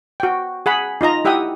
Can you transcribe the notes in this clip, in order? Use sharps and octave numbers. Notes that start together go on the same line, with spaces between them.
F#4 G5
G#4 F#5 B5
D#4 F4 D#5 A#5
E4 G4 E5 F#5 G5 D#6